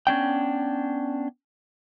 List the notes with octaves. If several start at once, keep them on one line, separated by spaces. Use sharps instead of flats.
B3 C#4 D4 G5